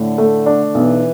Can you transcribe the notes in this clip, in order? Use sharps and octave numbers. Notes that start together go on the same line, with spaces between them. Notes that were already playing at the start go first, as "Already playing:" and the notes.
Already playing: A2 D3
A3
D4
B2
D3
B1 E3